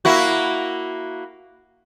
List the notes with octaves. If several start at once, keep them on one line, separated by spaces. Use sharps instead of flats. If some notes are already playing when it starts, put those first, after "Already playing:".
A#3 E4 F#4